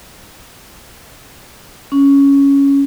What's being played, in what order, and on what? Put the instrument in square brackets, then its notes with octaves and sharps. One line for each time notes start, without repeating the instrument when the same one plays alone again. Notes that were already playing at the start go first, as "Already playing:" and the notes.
[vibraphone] C#4